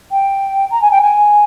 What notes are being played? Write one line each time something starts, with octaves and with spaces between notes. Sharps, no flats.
G5
A#5
G#5
G5
G#5